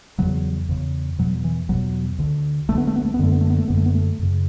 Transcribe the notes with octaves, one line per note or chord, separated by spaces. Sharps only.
E2 C#3 F#3
E2 C#3
E2 B2 F#3
E3
E2 B2 F#3
D2 D3
D2 D3 A3
B3
A3
B3
A3
B3
F#2 D3 A3
B3
A3
B3
A3
F#2 D3 B3
A3
B3
A3
F#2 C#3